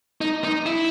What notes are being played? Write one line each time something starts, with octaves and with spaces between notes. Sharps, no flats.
D#4
D#4
E4